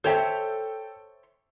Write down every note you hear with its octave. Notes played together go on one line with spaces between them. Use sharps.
A4 C5 C#5 E5 G5 A5